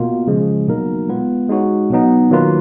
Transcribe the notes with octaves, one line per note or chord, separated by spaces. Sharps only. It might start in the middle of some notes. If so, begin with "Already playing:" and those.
Already playing: B2 A#3 F4
C#3 F3 G#3
B2 F#3 A#3 D#4 A#4
G#3 B3 F4 B4
G#3 D#4 F#4 C#5
B2 F#3 B3 D#4
D#3 F#3 A#3 F4 B4